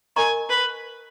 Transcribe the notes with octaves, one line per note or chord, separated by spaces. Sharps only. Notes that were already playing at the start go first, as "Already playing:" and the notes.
A#4 D#5 G#5 A#5 C#6
B4